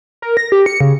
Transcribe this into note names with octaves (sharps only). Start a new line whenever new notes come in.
A#4
A#6
G4
C#7
C#3